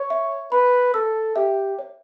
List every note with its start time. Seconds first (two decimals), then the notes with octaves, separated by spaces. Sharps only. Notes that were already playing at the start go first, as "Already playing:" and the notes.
Already playing: C#5
0.10 E5
0.52 B4 B5
0.94 A4 E6
1.36 G4 E5
1.79 C#5